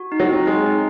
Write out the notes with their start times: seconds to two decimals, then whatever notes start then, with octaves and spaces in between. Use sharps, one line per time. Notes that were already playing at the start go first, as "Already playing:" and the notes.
Already playing: F#4
0.12 D#4
0.20 F#3
0.29 C4
0.47 G#3 D#4
0.65 D#4